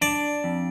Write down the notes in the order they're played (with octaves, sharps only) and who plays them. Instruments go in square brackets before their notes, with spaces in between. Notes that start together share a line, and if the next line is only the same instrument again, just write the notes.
[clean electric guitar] D4 [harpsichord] D5
[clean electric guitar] F2